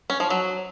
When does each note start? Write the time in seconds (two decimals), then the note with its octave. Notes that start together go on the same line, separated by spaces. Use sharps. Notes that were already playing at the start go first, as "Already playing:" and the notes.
0.10 C#4
0.20 F3
0.30 F#3